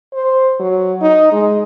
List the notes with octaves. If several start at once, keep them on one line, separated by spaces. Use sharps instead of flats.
C5
F#3
D#4
G#3